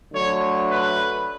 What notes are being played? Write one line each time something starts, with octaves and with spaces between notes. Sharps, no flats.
D3 F#3 A3 C#5
B4